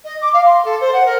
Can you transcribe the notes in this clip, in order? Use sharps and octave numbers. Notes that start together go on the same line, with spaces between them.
D#5
D6
F5
C6
A4
C5
F#5
A#4